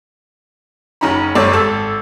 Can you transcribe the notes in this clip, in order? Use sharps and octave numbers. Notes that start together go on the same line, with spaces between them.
F#1 C#4 D#4 A#5 B5
G1 F#2 C4 A4 C#5 D5
G#1 A4 E6